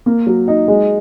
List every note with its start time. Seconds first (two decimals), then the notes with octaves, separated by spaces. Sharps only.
0.06 A#3
0.27 F#3
0.48 D#4
0.68 G#3